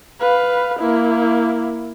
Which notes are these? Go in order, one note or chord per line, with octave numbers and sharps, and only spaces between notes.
B4 F5
A#3 E4